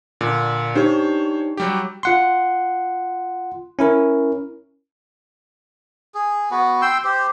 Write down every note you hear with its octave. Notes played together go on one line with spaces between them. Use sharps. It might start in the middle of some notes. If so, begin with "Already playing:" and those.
A#2 D3
D4 D#4 G4 C5 C#5
F#3 G3 G4
F4 F#5 C6
C#4 E4 A#4
G#4
B3 F#4 B4
G5 C6 E6
G4 C5